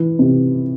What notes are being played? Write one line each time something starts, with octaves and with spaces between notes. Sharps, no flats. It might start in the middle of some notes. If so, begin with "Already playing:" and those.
Already playing: E3
C3